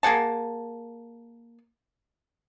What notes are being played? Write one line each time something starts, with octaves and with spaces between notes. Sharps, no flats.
A#3 G#4 F#5 A5